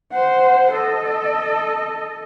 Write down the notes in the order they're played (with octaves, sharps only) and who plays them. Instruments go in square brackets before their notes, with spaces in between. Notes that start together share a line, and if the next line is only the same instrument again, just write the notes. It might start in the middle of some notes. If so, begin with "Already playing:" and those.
[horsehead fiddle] C5 F#5
A4 D#5